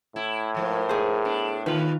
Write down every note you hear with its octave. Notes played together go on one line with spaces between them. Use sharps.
A2 E4
G#2 F3 A#3
G#4 C5
B3 D4
D#2 D#3 F4 B4